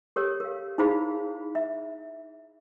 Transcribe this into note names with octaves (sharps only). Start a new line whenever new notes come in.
G4 A4 A#4 C#5
A#4 F5
D#4 E4 G#4 C5 F5 B5
E5